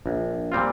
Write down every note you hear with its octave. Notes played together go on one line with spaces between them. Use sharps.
A#1
A#2 G3 C4 F4